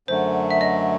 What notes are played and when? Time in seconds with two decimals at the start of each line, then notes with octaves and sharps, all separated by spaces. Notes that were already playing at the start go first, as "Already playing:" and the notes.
0.08 F#2 D3 F#3 A3 C5
0.51 E5
0.61 D#5